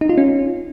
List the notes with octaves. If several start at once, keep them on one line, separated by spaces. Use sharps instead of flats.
D#4
F4
C#4